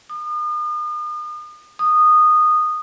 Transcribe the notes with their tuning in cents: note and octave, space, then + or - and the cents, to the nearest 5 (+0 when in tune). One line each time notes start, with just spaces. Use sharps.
D#6 -40
D#6 -15